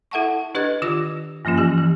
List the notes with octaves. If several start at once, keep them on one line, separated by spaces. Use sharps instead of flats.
E4 A4 E5 F#5 A5 C#6
D4 G4 B4 D#5 F#6 G#6
D#3 F4 D6 E6 A#6
G2 F3 A#3 C#4 F4
E3 G4
E3